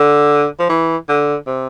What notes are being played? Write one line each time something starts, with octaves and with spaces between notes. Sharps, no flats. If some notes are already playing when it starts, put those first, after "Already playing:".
Already playing: D3
F3
E3
D3
C3